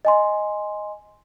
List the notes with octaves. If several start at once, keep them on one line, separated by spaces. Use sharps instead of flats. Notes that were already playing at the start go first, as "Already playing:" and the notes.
D#5 G#5 C6